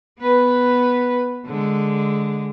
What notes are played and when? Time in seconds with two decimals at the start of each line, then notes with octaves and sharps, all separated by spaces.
0.19 B3 B4
1.47 D3 G#3